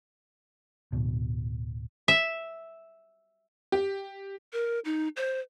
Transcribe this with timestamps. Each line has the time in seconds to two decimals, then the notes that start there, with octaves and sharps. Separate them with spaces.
0.92 D1 B2
2.08 E5
3.72 G4
4.53 A#4
4.85 D#4
5.17 C5